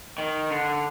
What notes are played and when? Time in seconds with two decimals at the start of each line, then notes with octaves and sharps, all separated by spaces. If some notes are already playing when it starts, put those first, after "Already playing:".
0.18 D#3
0.51 D3